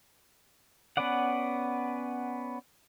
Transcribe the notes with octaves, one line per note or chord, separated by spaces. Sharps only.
B3 C#4 B4 D5 F#5